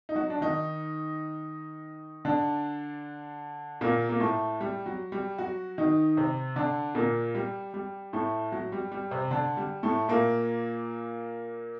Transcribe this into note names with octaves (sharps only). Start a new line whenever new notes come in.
D#4
F#3 F#4
D4
D#3 D#4
D3 D4
A#2 A#3
A#3
A2 A3
G3
F#3
G3
F#3 F#4
D#3 D#4
C3 C4
D3 D4
A#2 A#3
G3
G3
A2 A3
F#3
G3
G3
C3 C4
D3 D4
G3
A2 A3
A#2 A#3